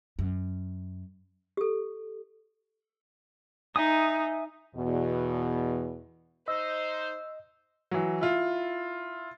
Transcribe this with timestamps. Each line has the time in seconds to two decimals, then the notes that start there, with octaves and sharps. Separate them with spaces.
0.19 F#2
1.57 G4 A4
3.76 D#4 E5 G#5 D#6
4.75 E2 B2
6.48 D#4 C5 D#5 E6
7.91 E3 F#3
8.21 E4 F4